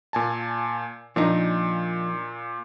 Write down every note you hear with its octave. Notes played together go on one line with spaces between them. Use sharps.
A#2 G#5 A5
A#2 F3 D4 D#4